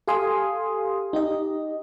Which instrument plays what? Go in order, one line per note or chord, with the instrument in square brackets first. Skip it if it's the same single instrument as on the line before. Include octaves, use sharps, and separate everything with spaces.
[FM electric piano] G4 A4 F5 G#5 C6 D#6
D#4 G4 D#5